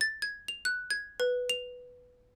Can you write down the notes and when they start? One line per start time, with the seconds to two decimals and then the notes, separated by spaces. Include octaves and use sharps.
0.01 A6
0.22 G#6
0.48 F7
0.65 F#6
0.90 G#6
1.20 B4
1.50 F7